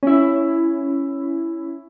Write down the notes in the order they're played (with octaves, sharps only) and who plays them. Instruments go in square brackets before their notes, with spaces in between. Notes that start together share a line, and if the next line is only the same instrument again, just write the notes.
[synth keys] C#4 E4